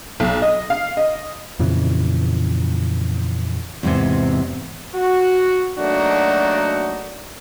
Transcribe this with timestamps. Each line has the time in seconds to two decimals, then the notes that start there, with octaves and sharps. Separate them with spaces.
0.20 B1
0.42 D#5
0.70 F5
0.97 D#5
1.59 F2 A#2 C#3 E3
3.83 E2 G#2 C3
4.95 F#4
5.79 F#3 A3 A#3 D4 D#4 F#4